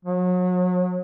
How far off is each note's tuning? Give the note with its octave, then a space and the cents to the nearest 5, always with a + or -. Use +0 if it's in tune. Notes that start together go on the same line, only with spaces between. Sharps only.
F#3 -35